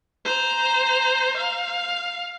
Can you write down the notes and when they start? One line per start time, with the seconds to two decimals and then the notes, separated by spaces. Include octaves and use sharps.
0.25 C5 A#5
1.37 F5